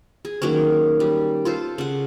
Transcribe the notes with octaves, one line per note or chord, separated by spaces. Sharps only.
G#4
D#3 F#3 A#3 C#4
G3
F4 A4 C5
C#3 F#5